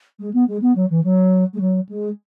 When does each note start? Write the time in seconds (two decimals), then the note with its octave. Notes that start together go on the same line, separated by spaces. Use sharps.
0.19 G#3
0.33 B3
0.48 G#3
0.62 B3
0.75 F#3
0.90 E3
1.04 F#3
1.54 G#3
1.60 F#3
1.89 G#3